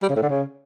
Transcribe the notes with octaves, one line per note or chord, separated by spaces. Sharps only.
G3
C#3
A2
D3
C#3